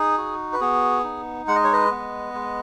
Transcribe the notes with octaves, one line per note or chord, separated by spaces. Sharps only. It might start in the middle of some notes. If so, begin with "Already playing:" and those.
Already playing: D#4 G#4
F#4
B4
B3 G#4
D#4
G#3 F#5
D#5
C#5
B4 D#5
B3
G#3